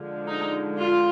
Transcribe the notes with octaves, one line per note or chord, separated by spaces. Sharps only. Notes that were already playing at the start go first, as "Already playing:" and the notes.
Already playing: D3 F3 G#3
D#4
F4